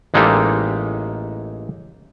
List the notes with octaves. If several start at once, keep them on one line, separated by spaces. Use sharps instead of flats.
A1 G#3 A#3 D#4 G4 A4